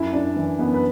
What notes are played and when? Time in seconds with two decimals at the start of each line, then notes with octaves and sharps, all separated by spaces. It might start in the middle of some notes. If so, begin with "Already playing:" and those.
Already playing: F#2 E4
0.13 F#2 D4
0.36 E3
0.59 F#2 B3
0.74 B4